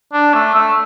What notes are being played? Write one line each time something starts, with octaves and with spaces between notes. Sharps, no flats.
D4
A3
A3